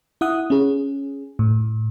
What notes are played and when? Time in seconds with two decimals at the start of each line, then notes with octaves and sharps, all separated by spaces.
0.21 E4 E5 F#5 D#6 F#6
0.50 C#4 G#4
1.39 A2